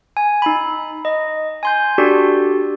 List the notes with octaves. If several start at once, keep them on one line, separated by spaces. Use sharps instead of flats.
G#5
D#4 B5
D#5
G#5 C6 G6
D4 F#4 G4 A4 D5